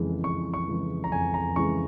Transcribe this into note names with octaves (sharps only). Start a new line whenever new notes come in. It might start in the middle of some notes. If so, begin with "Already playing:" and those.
Already playing: F2 C#3 E3 G#3
F2 C#6
C#6
C#3 E3 G#3
A#5
F2 G#5
A#5
C#3 E3 G#3 C#6